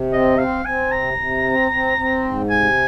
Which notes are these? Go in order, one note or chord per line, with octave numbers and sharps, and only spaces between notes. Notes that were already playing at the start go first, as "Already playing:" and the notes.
Already playing: C3
C4 D#5
C4 F5
C4 G#5
C3 A#5
C3
C4
C4
C4
G#2
C3 G#5